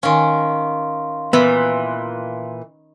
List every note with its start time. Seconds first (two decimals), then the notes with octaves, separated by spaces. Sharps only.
0.03 D#3 C#4 F5 C6
1.33 A#2 E3 B3 B5